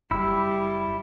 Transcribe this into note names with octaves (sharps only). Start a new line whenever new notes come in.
F#1 G3 E4 B5 E6